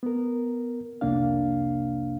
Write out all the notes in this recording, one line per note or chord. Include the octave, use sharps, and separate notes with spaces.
B3 A#4
C2 F2 C3 A#3 D4 F5